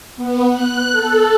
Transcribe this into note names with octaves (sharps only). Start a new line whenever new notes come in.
B3
F#6
A4